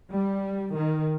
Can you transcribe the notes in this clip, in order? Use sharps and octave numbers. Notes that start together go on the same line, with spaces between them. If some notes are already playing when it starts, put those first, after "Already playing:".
G3
D#3